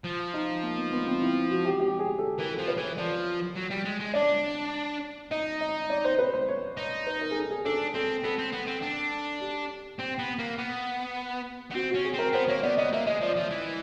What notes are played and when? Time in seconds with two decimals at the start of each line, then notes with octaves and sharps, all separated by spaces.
0.04 F3
0.34 D#4
0.63 A#3
0.78 B3
0.92 B3
1.07 C4
1.21 E4
1.51 F#4
1.65 G4
1.80 G4
1.99 G#4
2.19 A4
2.39 E3 A#4
2.53 A4
2.58 F3
2.68 B4
2.77 E3
2.83 C#5
2.97 F3 D5
3.56 F#3
3.70 G3
3.85 G#3
4.00 G#3
4.14 D4 D5
5.31 D#4 D#5
5.61 D#5
5.90 D5
6.04 C5
6.19 B4
6.34 C5
6.48 C#5
6.77 D#4
7.07 B4
7.21 A#4
7.31 G#4
7.36 A4
7.51 G#4
7.65 D4 A4
7.94 C4 A4
8.24 B3 A4
8.39 C4
8.53 B3
8.67 C4
8.83 D4
9.40 G4
9.99 C4
10.19 B3
10.39 A#3
10.58 B3
11.71 B3
11.75 C4 F#4
11.90 F#4
11.95 C#4
12.05 G#4
12.14 C4 A#4
12.34 B3 C5
12.48 A#3 C#5
12.63 B3 D5
12.77 B3 D#5
12.93 A#3 E5
13.07 G#3 D#5
13.21 F3 D5
13.36 F3 E5
13.51 E3